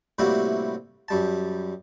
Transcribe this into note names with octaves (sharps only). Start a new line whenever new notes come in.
A2 C3 G3 A#3 E4 F#4
F#2 G3 A5